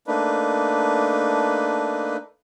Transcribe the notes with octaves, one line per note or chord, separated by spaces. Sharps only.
A3 A#3 D4 D#4 B4